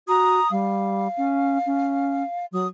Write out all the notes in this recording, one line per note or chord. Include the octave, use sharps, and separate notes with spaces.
F#4 A#5 D#6
G3 F5
C#4
C#4
F#3 D#6